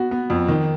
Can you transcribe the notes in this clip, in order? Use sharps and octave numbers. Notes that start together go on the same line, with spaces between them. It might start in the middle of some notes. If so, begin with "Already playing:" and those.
Already playing: B3 F#4
B3
F2
D#3